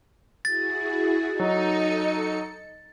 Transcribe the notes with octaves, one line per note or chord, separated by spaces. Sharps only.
E4 F#4 G#4 A6
F#3 D#4 A4 C#7